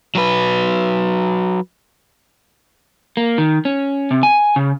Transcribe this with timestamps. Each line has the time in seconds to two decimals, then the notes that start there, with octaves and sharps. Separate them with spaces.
0.15 F#3 B4
3.17 A#3
3.38 D#3
3.65 C#4
4.11 C3
4.23 G#5
4.56 C#3